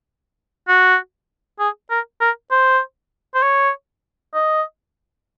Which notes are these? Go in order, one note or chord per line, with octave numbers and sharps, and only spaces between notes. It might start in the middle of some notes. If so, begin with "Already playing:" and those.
F#4
G#4
A#4
A#4
C5
C5
C#5
D#5